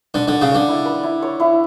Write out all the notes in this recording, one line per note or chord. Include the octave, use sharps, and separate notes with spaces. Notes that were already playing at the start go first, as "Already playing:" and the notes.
D3 D5
D3
D5
C#3
D3 D5
E4
B4
E4
C#5
E4